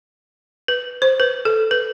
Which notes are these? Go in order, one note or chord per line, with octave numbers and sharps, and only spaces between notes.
B4
C5
B4
A4
B4